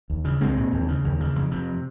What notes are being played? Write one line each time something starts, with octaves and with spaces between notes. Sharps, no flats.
D#2
C#3
C2 G#3 C4
A#2
D#2
C#3
D#2
C#3
F2
C3